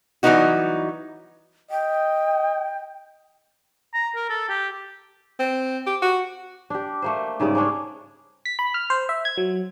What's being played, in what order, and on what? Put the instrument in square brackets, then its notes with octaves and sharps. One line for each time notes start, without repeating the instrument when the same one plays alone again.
[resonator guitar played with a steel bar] E3 F#3 G3 B3 D#4 F#4
[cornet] D#5 [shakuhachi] G5
[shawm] A#5
A#4
A4
G4
[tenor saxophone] C4
G4
F#4
[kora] D4 G4
A3 A#3 C5
G#2 C#3 G3 D5
A#3 C#4 D4 G#4
[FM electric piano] B6
B5
F6
C5
E5
G#6
F#3